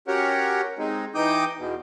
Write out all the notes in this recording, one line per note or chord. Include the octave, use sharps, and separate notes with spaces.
C#4 F#4 G4 A#4 C#5 F#5
G#3 C4 D#4
E3 D#4 G5 D6 D#6 G6
E2 B2